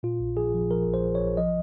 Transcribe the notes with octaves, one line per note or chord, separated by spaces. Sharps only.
A#2 F4
A#1
F3 G#4
F3
F3 A#4
A#1
C5
A#1
C#5
A#1
F3 D#5